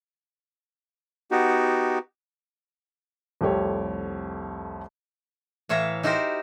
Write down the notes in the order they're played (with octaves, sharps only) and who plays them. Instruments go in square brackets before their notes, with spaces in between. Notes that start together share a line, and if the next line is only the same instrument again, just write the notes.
[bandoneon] B3 D#4 F#4 G4
[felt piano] C2 F2 A3 G4 A4 C#5
[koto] A2 E3 C#5 E5 F5 A#5
D#4 E4 F#4 G4 A#4 C5